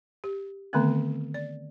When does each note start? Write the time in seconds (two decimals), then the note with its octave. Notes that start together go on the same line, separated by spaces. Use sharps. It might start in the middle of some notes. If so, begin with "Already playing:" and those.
0.24 G4
0.73 D3 D#3 A3 B3 C4
1.34 D5